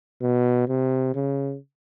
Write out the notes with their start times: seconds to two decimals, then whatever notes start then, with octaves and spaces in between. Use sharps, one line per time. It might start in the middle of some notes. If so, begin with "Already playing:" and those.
0.22 B2
0.68 C3
1.15 C#3